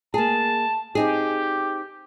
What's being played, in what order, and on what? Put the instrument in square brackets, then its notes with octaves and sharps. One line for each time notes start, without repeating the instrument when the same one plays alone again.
[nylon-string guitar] A#3 G#4 [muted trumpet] A5
[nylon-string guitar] C4 D#4 G#4 [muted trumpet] G4